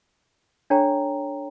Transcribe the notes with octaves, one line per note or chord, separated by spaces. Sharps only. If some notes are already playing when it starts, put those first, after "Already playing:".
D4 A4 C#5 G5 A#5